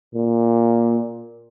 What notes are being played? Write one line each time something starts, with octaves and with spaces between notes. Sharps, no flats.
A#2